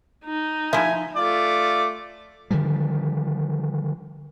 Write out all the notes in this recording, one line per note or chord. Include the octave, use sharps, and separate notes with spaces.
D#4
F3 E4 E5 G#5
A3 F4 D5
D3 D#3 F3 G3